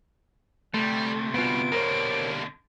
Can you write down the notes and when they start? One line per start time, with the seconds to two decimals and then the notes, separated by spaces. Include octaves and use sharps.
0.74 D2 C3 G3 A3
1.34 G2 B2 B3 F4 D7
1.72 B2 D3 G3 A#3 A#4 C5 C#5